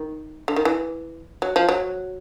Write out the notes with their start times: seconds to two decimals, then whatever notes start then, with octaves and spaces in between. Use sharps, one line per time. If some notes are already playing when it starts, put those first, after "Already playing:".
Already playing: D#3
0.48 D3
0.56 D#3
0.65 E3
1.42 F#3
1.56 F3
1.69 F#3